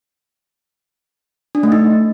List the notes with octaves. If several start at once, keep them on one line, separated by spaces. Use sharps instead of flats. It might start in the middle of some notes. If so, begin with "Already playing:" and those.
D4
A3
D#4